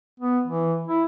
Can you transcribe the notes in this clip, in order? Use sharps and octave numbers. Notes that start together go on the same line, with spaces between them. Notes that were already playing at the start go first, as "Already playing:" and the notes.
B3
E3
E4